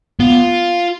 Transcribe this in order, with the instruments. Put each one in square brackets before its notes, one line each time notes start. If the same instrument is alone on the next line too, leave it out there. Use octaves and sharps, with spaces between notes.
[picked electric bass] B3 [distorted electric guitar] F4